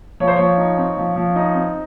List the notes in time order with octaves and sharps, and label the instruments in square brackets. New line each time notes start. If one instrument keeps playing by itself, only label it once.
[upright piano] F3 C#5
C5
F3 C#5
D#4
C4
F3
F3
D#4
C4